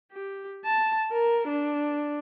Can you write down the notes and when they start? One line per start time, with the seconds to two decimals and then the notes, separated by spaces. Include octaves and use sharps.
0.12 G4
0.64 A5
1.12 A#4
1.48 D4